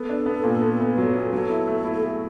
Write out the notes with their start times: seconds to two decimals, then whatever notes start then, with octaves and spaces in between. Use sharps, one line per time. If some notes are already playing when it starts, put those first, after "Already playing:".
Already playing: B3 A4
0.09 D4
0.26 B3
0.44 A#2
0.61 B3
0.80 B3
0.98 F#3
1.14 B3
1.32 F#3 A4
1.50 E4
1.67 A3
1.84 E4
1.92 A4
2.02 A3 G#4